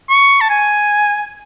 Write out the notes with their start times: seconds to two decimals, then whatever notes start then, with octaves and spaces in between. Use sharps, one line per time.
0.10 C#6
0.41 A5
0.50 G#5